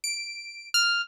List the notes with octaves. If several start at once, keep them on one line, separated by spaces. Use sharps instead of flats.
D7
F6